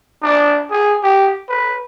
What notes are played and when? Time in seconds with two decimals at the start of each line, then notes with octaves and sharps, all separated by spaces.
0.23 D4
0.70 G#4
1.03 G4
1.49 B4